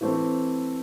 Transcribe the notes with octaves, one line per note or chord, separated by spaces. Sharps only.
E3 A3 C4